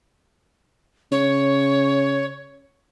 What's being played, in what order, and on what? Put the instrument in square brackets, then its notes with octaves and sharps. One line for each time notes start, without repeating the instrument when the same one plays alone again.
[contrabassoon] C#3 [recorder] C#5